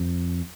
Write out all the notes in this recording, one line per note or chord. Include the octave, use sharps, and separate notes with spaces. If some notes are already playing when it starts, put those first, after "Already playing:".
Already playing: F2